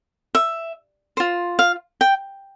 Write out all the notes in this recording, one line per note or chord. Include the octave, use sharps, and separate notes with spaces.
E5
F4 C5
F5
G5